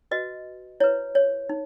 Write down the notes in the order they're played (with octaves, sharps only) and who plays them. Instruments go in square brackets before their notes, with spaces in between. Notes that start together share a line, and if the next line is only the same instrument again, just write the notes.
[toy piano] F#4 B4 D#5
E4 B4 C#5
C#5
D#4